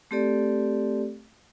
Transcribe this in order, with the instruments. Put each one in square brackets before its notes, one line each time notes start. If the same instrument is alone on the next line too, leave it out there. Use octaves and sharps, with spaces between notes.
[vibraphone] A3 C4 G4 A4 D5